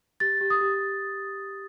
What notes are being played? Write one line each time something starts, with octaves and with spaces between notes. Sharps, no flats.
G4 A6
G4
D#6
G4